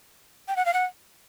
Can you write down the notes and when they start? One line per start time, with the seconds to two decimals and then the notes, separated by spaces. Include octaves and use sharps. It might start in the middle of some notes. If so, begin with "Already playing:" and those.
0.48 G5
0.56 F#5
0.66 F5
0.73 F#5